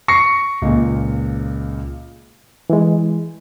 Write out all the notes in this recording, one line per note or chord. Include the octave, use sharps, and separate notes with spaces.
C#6 A#6 C7 C#7
C#2 A#2
E3 G#3